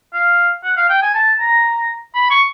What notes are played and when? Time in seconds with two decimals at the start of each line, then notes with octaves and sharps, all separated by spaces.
0.14 F5
0.64 F#5
0.77 F5
0.90 G5
1.02 G#5
1.15 A5
1.40 A#5
2.15 B5
2.31 C#6